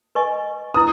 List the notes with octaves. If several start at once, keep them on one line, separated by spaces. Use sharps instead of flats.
B4 D#5 G#5 C#6
E4 B4 D#6